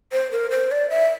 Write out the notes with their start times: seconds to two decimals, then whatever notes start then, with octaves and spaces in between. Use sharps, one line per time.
0.12 C5
0.32 A#4
0.51 C5
0.71 D5
0.90 E5